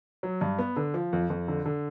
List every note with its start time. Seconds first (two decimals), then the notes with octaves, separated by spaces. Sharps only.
0.23 F#3
0.41 G2
0.59 B3
0.76 D3
0.94 F3
1.13 F2
1.30 F2
1.48 D3
1.66 D3